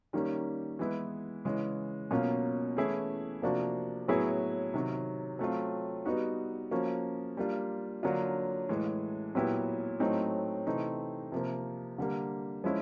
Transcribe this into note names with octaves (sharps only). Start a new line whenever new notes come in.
D#3 G3 A#3 C#4
E3 G#3 B3 E4
C#3 E3 G#3
B2 F#3 A#3 C#4 F4
E3 A3 C#4 E4 G#4
C3 F3 A#3 D4 F#4
A2 F#3 B3 E4 G#4
C3 D#3 F#3
F#3 A3 C4 F4
G3 B3 D#4 F#4
F3 A#3 C#4 F#4
G3 A#3 D4 F4
D3 F#3 A#3 D4 F4
A2 E3 G#3
A#2 F#3 B3 E4 G4
A2 F#3 A3 C4 D#4
C3 E3 A3 C4 D#4
C3 F3 A#3
D3 G3 A#3
F3 G#3 C#4 E4